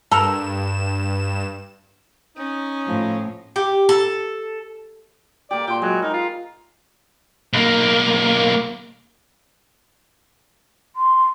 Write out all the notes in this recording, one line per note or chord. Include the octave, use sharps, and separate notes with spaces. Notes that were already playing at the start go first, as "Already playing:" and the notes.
G2 A4 A#4 E7
C#4 D#4
A2 F3
G4
A4
A#3 G4 D5
A#2 G5 C6
F#3 G#3 B4
D#4 A#4
F4
B1 A#3
C6